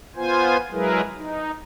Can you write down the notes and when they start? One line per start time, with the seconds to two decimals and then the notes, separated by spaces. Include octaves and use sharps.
0.16 B3 F4 C5 G#5
0.72 F#3 G#3 E4 G#4 A#4 B4
1.16 D#4